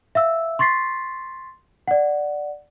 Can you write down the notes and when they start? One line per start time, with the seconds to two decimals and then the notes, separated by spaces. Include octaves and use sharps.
0.15 E5 F5 E6
0.59 C6 C#6 A6 B6 C7
1.88 D5 F#5